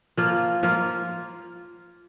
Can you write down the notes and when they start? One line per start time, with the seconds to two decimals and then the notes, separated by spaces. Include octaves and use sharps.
0.17 F3 A#3 F4
0.63 F3 A#3 F4